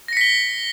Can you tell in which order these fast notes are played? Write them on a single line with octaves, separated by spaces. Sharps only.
A#6 C#7 B6 G7